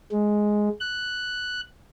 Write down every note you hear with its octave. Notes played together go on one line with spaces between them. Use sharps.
G#3
F#6